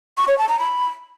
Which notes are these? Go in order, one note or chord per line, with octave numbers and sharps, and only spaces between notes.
C#6
C#5
A5
A#5
B5